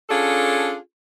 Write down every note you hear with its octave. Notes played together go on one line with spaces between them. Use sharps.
C#4 D4 F4 G#4 A4